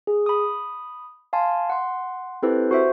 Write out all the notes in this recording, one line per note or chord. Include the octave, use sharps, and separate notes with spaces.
G#4
B5 D#6
F5 G#5 A5 C6
F#5 C6
C4 E4 G4 A4 B4 C5
F#4 C5 E5